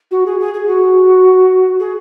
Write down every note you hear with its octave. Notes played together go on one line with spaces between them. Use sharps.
F#4
G#4
G#4
G#4
F#4
G#4